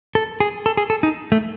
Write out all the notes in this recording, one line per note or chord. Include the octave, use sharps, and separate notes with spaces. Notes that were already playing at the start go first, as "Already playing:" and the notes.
A4
G#4
A4
G#4
A4
D#4
A3